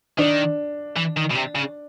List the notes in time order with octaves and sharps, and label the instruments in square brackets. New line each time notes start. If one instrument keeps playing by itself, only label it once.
[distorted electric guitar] D#3 [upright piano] D4
[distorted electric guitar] E3
D#3
B2
C3
C#3